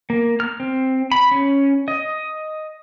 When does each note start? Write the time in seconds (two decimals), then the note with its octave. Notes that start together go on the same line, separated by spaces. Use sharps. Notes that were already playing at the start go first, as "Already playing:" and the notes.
0.10 A#3
0.40 F6
0.60 C4
1.12 B5
1.31 C#4
1.88 D#5